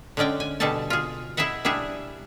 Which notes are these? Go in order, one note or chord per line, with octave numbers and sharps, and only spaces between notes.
D3 G#3 C#4 D5 G5
G#5
B2 D3 G3 G#4 A4 A5
F4 G#4
E4 G#4 D#5 E5 F#5
G3 D4 E4 G#4